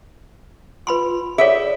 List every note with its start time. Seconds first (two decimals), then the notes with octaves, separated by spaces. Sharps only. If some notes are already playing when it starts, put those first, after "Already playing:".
0.87 F4 B4 B5 C6
1.38 G#4 A4 C#5 D5 E5